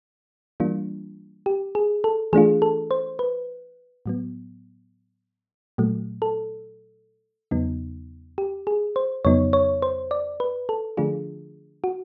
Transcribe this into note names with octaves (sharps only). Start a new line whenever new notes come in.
E3 G3 A#3 D4 F4
G4
G#4
A4
E3 A3 D4 F4 G#4
A4
C5
B4
A2 F#3 B3
A#2 F#3 A3
A4
E2 C#3 F#3 B3 D#4
G4
G#4
C5
F2 C#3 F#3 B3 D#4 C#5
C#5
C5
D5
B4
A4
D3 F3 A3 D4 F4 G#4
F#4